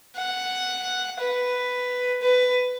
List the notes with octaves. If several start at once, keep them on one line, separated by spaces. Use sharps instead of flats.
F#5
B4
B4